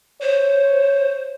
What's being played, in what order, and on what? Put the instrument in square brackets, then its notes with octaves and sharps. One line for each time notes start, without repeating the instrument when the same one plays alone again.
[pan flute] C5 [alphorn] C#5